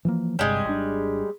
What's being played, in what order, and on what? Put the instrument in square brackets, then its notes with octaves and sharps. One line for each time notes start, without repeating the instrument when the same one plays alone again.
[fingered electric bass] E3 F3 A#3
[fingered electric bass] G1 G2 C3 [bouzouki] G3 G#3
[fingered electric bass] G#1 D4